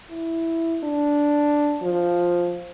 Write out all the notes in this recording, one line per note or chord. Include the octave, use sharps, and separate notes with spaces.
E4
D4
F3